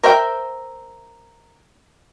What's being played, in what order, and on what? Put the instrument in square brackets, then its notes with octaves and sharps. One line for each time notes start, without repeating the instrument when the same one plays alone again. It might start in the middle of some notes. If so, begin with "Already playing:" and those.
[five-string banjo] A#4 C5 E5 G5